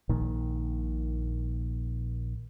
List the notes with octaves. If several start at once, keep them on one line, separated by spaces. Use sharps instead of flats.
A#1 A#2 D#3